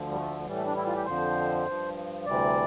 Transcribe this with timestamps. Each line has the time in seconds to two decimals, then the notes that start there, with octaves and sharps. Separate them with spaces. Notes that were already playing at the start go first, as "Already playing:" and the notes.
Already playing: D2 D3 F3
0.11 G3
0.17 A3
0.46 A2 E3 G3
0.57 A3
0.66 D4
0.77 E4
0.87 F4
0.96 G4
1.06 F2 D3 F3 C5
1.66 G2 F3
2.26 D2 C3 E3 G3 D5